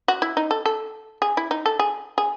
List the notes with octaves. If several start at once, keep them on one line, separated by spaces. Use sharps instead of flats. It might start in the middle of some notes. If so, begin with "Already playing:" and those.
F#4
E4
D#4
A4
A4
G#4
E4
D#4
A4
G#4
G#4